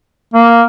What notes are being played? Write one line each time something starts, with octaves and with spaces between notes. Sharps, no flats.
A#3